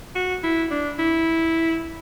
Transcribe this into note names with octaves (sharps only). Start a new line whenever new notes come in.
F#4
E4
D4
E4